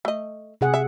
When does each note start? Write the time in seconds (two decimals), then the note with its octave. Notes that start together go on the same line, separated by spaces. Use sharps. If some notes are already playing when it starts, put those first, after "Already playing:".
0.05 A3 D#5
0.61 C3 G#4 F#5
0.74 E5